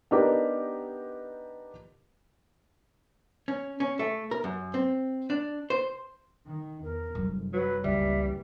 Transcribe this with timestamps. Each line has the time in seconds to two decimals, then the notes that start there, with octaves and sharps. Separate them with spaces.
0.11 B3 D4 D#4 G4 A#4
3.48 C#4
3.80 C#4
3.99 A3
4.31 A#4
4.44 F#2
4.74 C4
5.30 D4
5.70 C5
6.46 D#3
6.83 E2 A#4
7.15 F1 F#2 G3
7.53 F#3 B4
7.84 F#1 C#2 E3 G3 E5